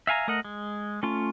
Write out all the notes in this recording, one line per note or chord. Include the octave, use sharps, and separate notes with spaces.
E5 F5 G#5 A#5
A3 A#4 D#5 F#5
G#3
A3 C#4 F4